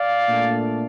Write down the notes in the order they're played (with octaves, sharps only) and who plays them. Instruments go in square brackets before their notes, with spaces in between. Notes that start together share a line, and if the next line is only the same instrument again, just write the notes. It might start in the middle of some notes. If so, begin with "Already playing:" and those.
Already playing: [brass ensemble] D5 F5
A#2 A3 D4